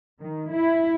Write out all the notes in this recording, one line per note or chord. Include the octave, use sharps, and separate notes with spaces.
D#3
E4